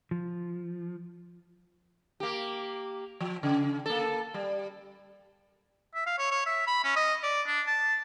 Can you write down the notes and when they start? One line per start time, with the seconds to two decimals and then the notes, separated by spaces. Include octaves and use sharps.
0.11 F3
2.20 A#3 G4
3.20 F3
3.43 C#3
3.86 A#3 A4
4.34 G3
5.95 E5
6.06 F5
6.19 C#5
6.31 C#5
6.46 E5
6.67 B5
6.84 C#4
6.96 D#5
7.23 D5
7.47 D4
7.67 A5